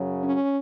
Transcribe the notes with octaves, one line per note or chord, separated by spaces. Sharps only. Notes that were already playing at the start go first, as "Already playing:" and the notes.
Already playing: F#2 C#3 F#3
C#4